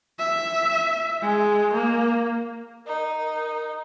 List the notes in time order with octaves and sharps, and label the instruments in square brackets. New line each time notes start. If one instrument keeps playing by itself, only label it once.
[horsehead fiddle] E5
G#3
A#3
[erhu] D#4 [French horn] A#4